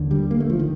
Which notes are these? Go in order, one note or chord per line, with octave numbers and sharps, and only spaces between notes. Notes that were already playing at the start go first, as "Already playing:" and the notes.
Already playing: D#2 D3
G3
A#3
A3
F3
D#3